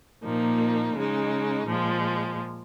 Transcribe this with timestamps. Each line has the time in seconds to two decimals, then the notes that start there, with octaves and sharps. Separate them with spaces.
0.24 A#2 F3 A#3 D#4
0.95 C#3 G#3 D#4
1.66 A#2 F3 G#3